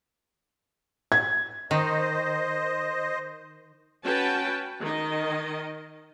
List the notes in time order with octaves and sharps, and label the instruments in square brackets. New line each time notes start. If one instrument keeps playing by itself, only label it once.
[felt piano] G#6
[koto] D#3 [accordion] C5 D#5
[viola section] C#4 F#4 B4 G5 A5
D#3 D#5